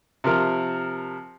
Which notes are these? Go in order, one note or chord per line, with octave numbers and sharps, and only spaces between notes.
C3 F3 A#4